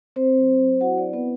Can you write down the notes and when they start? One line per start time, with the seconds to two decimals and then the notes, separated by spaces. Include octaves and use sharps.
0.16 C4 C5
0.38 F#3
0.60 F#3
0.81 E4 F#4 F#5
0.97 D4 D5
1.03 C4
1.13 B3 B4